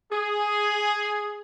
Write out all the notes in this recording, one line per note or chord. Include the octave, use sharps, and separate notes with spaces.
G#4